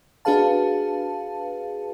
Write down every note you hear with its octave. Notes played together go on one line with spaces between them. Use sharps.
D4 F#4 G#4 B4 F5 A5